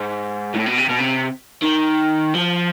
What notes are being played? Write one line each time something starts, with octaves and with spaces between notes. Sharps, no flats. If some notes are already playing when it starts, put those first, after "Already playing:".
Already playing: G#2
A2
B2
C3
B2
C3
D#3
F3